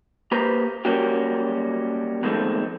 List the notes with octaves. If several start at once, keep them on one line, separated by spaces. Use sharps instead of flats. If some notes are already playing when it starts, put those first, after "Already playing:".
A#3 G4 B4 C5 A#5
F#3 G3 A#3 C#4 F#4 G4
B2 D#3 F3 G#3 A3 C4